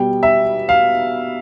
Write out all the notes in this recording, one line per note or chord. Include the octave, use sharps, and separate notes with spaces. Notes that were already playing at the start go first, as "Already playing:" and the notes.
Already playing: B2 G3 G5
E5
F5